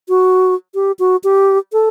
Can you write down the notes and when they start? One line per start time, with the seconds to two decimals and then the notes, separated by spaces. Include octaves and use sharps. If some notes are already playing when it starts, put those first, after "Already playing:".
0.09 F#4
0.75 G4
0.99 F#4
1.24 G4
1.73 A4